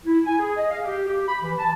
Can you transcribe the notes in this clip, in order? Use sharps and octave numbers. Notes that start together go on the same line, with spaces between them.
E4
G#5
G#4
D#5
F5
G4
G4
B5
E3
A5